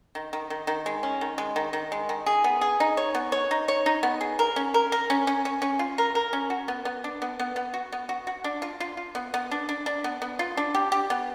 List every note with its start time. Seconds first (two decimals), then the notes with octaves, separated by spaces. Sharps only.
0.15 D#3
0.33 D#3
0.50 D#3
0.67 D#3
0.86 G#3
1.03 C#4
1.21 D#3
1.38 G#3
1.56 D#3
1.73 D#3
1.92 G#3
2.09 D#3
2.26 G#4
2.44 B3
2.61 G#4
2.80 D#4
2.97 C#5
3.15 B3
3.32 C#5
3.51 D#4
3.68 C#5
3.86 D#4
4.03 B3
4.21 G#4
4.39 A#4
4.56 C#4
4.74 A#4
4.92 A#4
5.10 C#4
5.27 C#4
5.45 C#4
5.62 C#4
5.79 F4
5.98 A#4
6.15 A#4
6.33 C#4
6.50 F#4
6.68 B3
6.85 B3
7.04 D4
7.22 B3
7.39 B3
7.56 B3
7.74 F#4
7.92 B3
8.09 F#4
8.27 F#4
8.44 D4
8.62 F4
8.80 F4
8.97 F4
9.15 B3
9.34 B3
9.51 D4
9.69 D4
9.86 D4
10.04 B3
10.22 B3
10.39 F4
10.57 D4
10.75 G4
10.92 G4
11.10 B3